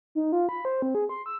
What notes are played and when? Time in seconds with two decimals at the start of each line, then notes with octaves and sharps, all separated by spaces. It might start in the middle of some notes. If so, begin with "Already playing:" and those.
0.15 D#4
0.32 F4
0.49 B5
0.65 C5
0.82 C4
0.95 G#4
1.09 C6
1.26 E6